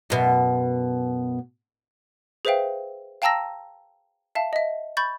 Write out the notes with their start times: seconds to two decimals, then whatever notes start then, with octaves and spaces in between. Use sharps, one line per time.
0.10 F#2 B2
2.45 G#4 B4 C5 E5 F5 G5
3.22 F5 G5 A5 A#5 E6 A#6
4.35 E5 F5 A5
4.53 D#5 E5
4.97 B5 C#6 G6 A6